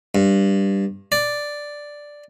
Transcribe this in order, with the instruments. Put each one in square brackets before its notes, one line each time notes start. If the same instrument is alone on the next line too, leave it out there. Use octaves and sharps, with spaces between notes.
[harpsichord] G2
D5